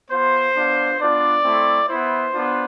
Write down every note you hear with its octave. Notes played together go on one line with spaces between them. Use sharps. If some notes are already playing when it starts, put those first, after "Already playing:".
B3 F4 C5
B3 D4 F4
B3 D4 F4 D5
A3 C4 E4
B3 E4 C5
B3 D4 F4